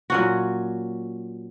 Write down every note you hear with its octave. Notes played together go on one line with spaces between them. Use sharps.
A#2 F#3 C#4 F#4